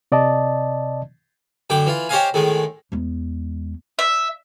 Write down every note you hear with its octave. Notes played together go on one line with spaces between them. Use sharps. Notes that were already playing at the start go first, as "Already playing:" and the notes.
C3 D5 D#5 A5
F#2 D3 G5 D6
E3 F4
G4 C5 C#5 D#5 F5 G#5
A2 D#3 G#3
E2 G#3
E5